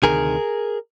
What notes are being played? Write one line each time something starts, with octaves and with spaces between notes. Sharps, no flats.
D2 C3 D#3 G#4 A#4